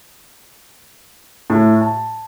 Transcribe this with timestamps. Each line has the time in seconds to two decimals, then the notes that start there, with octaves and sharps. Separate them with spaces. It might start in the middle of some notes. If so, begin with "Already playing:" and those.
1.50 A2
1.81 A5